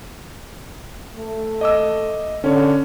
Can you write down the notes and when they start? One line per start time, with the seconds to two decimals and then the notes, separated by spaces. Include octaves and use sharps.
1.15 A3
1.61 D#5 D6 E6
2.44 D3 C#4 C#5